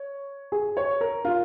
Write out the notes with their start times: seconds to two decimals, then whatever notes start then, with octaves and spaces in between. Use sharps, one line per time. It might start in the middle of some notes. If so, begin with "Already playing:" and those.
Already playing: C#5
0.52 G#4
0.77 C#5
1.01 A#4
1.25 F4